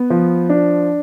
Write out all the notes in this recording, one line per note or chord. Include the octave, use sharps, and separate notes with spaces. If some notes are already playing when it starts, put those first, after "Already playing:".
Already playing: B3
F3
D4